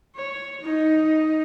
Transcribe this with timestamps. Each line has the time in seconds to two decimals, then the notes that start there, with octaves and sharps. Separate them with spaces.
0.16 C#5
0.61 D#4